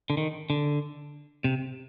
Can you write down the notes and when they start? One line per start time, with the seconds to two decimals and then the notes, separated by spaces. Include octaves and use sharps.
0.10 D3
0.17 D#3
0.50 D3
1.44 C3